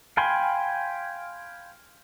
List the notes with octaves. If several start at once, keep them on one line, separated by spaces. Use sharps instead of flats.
F5 G5 G#5 B5 C6